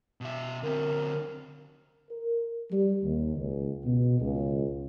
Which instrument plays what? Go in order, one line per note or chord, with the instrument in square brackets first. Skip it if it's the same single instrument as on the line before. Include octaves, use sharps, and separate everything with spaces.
[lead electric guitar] B2 E5
[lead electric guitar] D3 C4 [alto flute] A#4
[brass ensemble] A#4
G3
D#2
C#2
B2
C#2